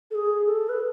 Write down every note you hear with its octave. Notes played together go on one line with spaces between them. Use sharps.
A4
G#4
A4
B4